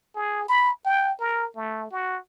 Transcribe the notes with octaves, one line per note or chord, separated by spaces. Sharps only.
G#4
B5
G5
A#4
A3
F#4